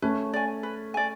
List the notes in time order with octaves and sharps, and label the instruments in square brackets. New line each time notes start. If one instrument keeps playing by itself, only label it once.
[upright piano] A3 C#4 [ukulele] B4
[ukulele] D5 G#5
B4
D5 G#5